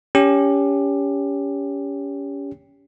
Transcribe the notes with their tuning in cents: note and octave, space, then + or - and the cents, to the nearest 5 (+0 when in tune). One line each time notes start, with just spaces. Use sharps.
C#4 +25 G4 +15